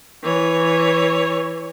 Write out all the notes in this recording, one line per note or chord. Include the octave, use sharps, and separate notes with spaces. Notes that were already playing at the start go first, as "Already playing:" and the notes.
E3 C#5